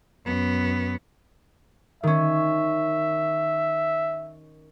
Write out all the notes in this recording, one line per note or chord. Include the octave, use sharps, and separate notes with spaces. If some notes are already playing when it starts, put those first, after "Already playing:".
F#2 B3
D#3 C#4 E5